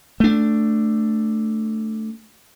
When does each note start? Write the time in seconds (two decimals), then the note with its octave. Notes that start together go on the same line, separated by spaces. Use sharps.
0.20 A3 D4